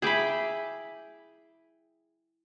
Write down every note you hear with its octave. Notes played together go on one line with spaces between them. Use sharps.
E4 G#4 G5 B5 D6